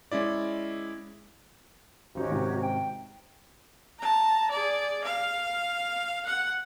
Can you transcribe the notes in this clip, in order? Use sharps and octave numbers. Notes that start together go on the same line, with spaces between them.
G#3 C#4 E4 D5
G#1 C#4 D#4 F#4 G4
G#2 C3 D#3
G5
A5 A#5
G#4 D5
F5
F#5